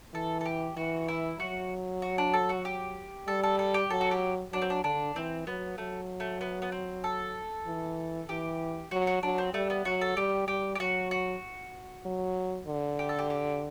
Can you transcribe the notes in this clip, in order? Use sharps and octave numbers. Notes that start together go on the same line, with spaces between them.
E3 A4
A4
G4
E3 F#4
E4
F#3 F#4
F#4
D4
A4
F#4
G4
G3 A4
A4
A4
G4
F#3 A4
F#4
G4
F#3 D4
C4
D4
D3 D4
E3 C4
F#3 B3
F#3 A3
A3
B3
B3
C4
A4
E3
E3 G4
F#3 F#4
F#4
F#3 D4
C4
G3 A3
B3
F#3 F#4
A4
G3 G4
G3 G4
G4
F#3 F#4
F#4
F#3
D3
G4
A4
G4
G4